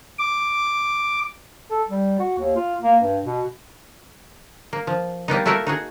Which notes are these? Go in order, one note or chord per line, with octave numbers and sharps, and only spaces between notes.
D6
A4
G3
F#4
D#2
F4
A#3
G2
B2
A#3
F3
G3 A#3 B3 D#4
A3 A#3 E4 F#4 A#4 E5
D#4 F#4 G#4